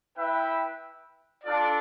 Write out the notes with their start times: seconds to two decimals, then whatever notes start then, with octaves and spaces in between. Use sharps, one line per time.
0.17 E4 B4 E5 G5
1.44 D4 F4 A4 D5